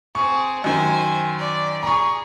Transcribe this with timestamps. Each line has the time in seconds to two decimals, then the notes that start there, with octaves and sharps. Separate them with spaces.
0.15 C4 G#4 C#6
0.64 F#2 D#3 C5 G#5
1.39 D5
1.83 G#4 A#5 C#6